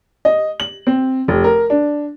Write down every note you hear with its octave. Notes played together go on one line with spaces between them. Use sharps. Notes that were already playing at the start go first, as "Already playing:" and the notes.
D#5
F#7
C4
F1
A#4
D4